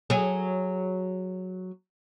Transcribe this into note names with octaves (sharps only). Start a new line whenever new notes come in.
F#3 G#4